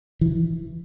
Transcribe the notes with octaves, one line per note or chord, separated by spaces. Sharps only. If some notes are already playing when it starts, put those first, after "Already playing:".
E3